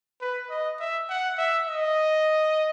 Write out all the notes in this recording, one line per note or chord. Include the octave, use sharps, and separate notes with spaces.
B4
D#5
E5
F#5
E5
D#5